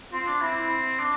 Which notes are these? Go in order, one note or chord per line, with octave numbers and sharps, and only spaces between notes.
C4 F4
D4
C4 E4
D4